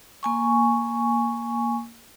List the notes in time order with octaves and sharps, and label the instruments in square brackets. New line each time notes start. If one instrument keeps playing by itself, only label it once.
[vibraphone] A#3 G#5 C#6